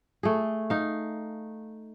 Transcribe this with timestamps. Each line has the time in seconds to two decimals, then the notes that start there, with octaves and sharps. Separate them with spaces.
0.23 A3 G#4
0.70 D#4 F5